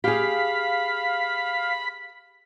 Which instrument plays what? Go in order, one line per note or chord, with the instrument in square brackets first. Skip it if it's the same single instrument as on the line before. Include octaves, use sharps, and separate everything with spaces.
[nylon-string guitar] G4 G#4 [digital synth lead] F5 [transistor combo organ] B5